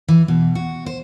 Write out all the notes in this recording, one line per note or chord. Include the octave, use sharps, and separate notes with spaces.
E3
B2
F#4
C5